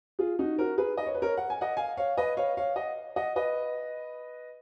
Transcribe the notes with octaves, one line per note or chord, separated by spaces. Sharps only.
F4 G#4
D#4 F#4
F#4 A#4
G#4 B4
D#5
C#5
B4
A#4 C#5
F#5
G#5
D#5 F#5
F5 G#5
C#5 F5
B4 D#5
C#5 F5
C#5 F5
D#5 F#5
D#5 F#5
B4 D#5